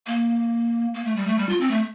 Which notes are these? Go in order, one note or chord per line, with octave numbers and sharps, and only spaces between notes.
A#3
A#3
A3
G3
A3
G3
F4
C4
A3